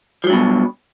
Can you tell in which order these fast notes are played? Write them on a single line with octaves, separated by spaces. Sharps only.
F3 F#3 G2 B2